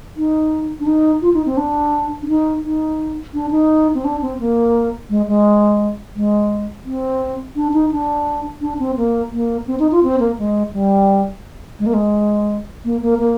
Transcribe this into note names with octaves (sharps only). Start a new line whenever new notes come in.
D#4
D4
D#4
F4
D#4
C4
D4
D4
D#4
D#4
D4
D#4
C4
D4
C4
A#3
G#3
G#3
G#3
C4
D4
D#4
D4
D4
C4
A#3
A#3
C4
D#4
F4
C4
A#3
G#3
G3
G#3
A#3
G#3
A#3
A#3
A#3